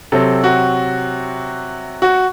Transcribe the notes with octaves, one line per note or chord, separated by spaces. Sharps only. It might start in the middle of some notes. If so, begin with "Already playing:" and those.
C3 F#3 C4 A4
F#4
F#4